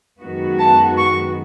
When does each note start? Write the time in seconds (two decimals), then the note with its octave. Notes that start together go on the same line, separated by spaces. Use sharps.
0.20 F#2 D#3 G#3 B3 F#4
0.59 A5
0.98 C#6